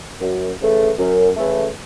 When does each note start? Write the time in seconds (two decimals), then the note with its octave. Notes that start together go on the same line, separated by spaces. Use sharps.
0.21 F#2
0.59 C#3 E3 A3
0.98 F#2
1.37 C#3 E3 A3